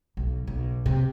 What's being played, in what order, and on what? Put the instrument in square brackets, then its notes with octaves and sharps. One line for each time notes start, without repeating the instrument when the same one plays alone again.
[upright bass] B1
B1
C3